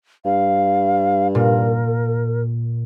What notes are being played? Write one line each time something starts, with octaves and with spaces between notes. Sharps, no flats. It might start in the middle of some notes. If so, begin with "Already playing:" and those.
G2 F5
A#2 A#4